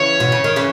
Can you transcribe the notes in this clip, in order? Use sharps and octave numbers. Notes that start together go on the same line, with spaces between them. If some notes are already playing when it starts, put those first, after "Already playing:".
Already playing: C#3 E3 C#5
B2
C#3
D#3
C#3 E3